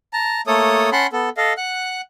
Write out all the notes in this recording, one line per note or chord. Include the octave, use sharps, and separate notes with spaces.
A5 A#5
A3 A#3 A4 C#5 D#6
C#4 F#5 A5 B5 C6
B3 A4
A4 D#5 F5
F#5 F#6